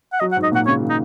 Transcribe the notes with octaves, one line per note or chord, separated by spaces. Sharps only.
F#5
F#3 D#5
F#5
G#2
D#5
A#2 F#5
C#3 C#5
D#3
D#4